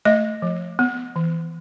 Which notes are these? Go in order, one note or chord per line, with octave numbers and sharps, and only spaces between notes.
A3 D#5
F3
B3
E3